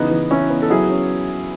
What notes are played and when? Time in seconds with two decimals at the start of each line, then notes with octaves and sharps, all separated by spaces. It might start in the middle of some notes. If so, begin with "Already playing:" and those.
Already playing: C#3 E3 B3 D#4
0.11 E3
0.31 E3 C#4 E4
0.50 B3
0.62 A4
0.70 F#3 E4 G#4
0.89 C#4